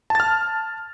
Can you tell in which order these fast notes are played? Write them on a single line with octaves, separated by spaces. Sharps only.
A5 A6 F6